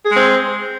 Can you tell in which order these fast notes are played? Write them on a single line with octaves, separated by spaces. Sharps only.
G#4 G#3 C4